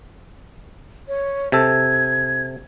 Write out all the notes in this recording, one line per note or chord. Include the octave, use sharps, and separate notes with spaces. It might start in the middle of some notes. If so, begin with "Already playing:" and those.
C#5
C3 A4 G#6